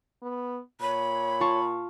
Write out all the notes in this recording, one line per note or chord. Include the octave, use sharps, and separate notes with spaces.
B3
A#2 C#5 B5
F4 A5 C#6